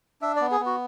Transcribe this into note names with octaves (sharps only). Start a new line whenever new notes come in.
D4 E5
B3 D5
G#4
B3
F#4